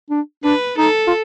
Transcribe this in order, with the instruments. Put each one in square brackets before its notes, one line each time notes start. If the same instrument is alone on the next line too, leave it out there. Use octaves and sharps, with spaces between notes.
[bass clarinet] D4
[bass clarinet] D4 [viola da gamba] B4
[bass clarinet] D#4 [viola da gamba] A4
[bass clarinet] F4